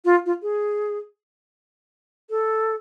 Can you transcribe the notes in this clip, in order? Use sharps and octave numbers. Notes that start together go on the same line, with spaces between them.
F4
F4
G#4
A4